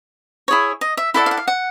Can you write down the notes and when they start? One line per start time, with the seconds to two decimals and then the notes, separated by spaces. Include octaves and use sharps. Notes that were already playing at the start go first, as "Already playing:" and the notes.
0.48 E4 G#4 C#5
0.81 D#5
0.97 E5
1.14 E4 A4 D5 F#5
1.26 F5
1.31 F#5
1.37 F5
1.47 F#5